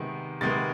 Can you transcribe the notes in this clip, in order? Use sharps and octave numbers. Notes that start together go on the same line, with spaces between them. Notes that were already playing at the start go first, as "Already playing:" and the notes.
Already playing: C3 D#3 G#3 B3
C3 D#3 G#3 B3 A6